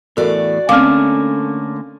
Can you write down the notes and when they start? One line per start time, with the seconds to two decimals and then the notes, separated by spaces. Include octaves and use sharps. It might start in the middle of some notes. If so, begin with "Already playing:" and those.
0.17 E2 A2 F#4 A4 A#4 D5
0.69 D3 A3 A#3 C4 C#4 F5 D6 F6